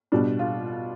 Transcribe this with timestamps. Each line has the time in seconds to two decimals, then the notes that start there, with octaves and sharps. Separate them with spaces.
0.12 B2 G3 D4
0.39 F4